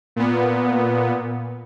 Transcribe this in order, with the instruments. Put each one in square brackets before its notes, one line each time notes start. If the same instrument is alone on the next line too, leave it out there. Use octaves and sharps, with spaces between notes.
[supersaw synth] A#2 B3